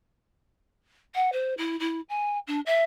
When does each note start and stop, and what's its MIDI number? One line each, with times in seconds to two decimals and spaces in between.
1.15 1.30 78
1.32 1.54 72
1.57 1.79 64
1.79 2.01 64
2.09 2.38 80
2.47 2.60 62
2.66 2.84 76